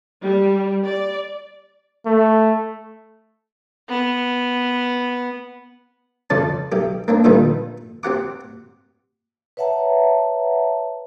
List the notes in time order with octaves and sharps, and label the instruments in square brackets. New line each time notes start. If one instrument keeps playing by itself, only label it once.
[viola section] G3
D5
[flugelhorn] A3
[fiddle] B3
[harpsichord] F2 C#3 D5 A5
B1 G4
A#3 C4 D4
A#2 D3 D#3 F3 G3 B3
C4 G4 F#5 D6
[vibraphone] B4 C#5 E5 F#5 A5 A#5